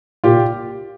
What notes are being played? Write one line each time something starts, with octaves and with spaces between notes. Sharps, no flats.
A#2 F4 G4